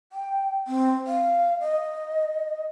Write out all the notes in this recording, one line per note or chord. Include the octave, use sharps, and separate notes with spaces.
G5
C4
F5
D#5